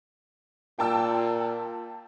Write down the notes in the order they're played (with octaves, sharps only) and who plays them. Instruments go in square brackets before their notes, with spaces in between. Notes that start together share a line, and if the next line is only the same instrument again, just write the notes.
[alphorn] A#2 [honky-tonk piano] G5 A5 E6